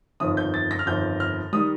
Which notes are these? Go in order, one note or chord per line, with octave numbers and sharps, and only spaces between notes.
G1 F2 D#3 D#6
G6
A6
A#6
F6
G1 F2 D#3 G6
F6
D#3 G3 D#6